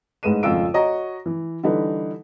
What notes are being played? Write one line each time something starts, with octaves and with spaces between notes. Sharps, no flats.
A1 G#2 G#3 B4 D#7 E7
G#1 F2 C#3 F4 E6 D7
F#4 C#5 D#5 A#5 C#6
E3
D3 E3 G3 D#4 B4